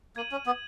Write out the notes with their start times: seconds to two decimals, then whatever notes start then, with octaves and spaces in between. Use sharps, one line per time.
0.16 A#3 G#6 D#7 F#7
0.32 C#4
0.46 B3